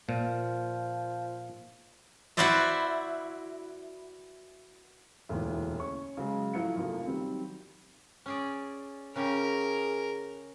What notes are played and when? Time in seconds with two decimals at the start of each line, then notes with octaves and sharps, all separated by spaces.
0.09 A#2 F3
2.37 E4 F#4 B4 C5 D5 E5
5.29 E1 D2 A#2 E3
5.79 C#4 C#6
6.17 C#3 F#3 G#3
6.54 A2 F3 F#3 E4 F4 C#7
6.75 F1 F2 F3 A#3
7.06 D#3 F#3 G3 C4
8.26 C#4 G#4 D5
9.16 C#3 C#4 G4 G#4 A#4